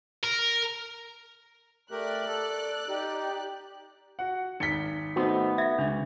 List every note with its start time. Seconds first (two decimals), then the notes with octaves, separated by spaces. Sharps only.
0.24 A#4
1.91 A3 G4 A#4 D5 F#6
2.26 A4
2.88 D#4 G4
4.19 F#4 F#5
4.60 G#1 B6 C#7 G7
5.16 A3 B3 C4 D#4 F#4
5.58 E5 G#6 A#6
5.79 C#2 C#3 D4